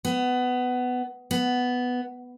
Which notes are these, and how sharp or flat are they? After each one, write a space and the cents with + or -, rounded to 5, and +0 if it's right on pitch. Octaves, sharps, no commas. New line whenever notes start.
B3 +15
B3 +5